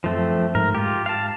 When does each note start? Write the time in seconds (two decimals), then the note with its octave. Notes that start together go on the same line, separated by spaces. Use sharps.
0.04 F#2 F3 A3 C4
0.55 G#2 A#4
0.75 G#2 F4 G4
1.06 F5 A5